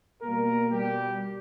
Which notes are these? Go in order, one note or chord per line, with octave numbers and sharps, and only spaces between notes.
B2 G3 A#3 A#4
G3 G4